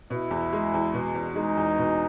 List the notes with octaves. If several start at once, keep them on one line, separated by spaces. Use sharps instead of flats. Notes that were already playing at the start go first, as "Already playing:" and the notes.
B2 E4
E2
G#3
E2
B2
E2
G#3 D#4
E2
B2